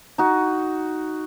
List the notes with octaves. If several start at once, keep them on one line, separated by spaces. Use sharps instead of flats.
D#4 F#4